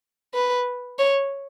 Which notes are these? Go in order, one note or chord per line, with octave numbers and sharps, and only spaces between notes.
B4
C#5